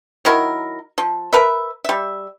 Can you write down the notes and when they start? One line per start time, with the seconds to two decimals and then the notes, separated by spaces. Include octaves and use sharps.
0.25 D#3 F#3 E4 A#4
0.98 F3
1.33 A#4 B4 E5
1.84 G3 E5